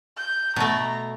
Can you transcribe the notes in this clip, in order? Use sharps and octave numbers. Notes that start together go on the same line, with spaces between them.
G6
B2 A3 A#5